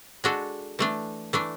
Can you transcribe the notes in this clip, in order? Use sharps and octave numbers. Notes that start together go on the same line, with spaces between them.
G#3 D4 F#4 A4
E3 A3 D4
E3 A3 D4